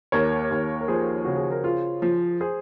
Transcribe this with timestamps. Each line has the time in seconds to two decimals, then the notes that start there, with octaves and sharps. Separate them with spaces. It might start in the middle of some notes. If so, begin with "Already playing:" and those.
0.12 D#2 A#4 C#5
0.51 D#2
0.81 A#4
0.88 F3 G#4 C5
1.25 C#3 F#4
1.37 G#4
1.51 A#4
1.64 F4 G#4 C5
2.02 F3
2.41 G#4 C5